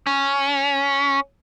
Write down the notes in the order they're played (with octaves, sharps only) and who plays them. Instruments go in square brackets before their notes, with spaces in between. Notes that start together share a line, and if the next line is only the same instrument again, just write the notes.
[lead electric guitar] C#4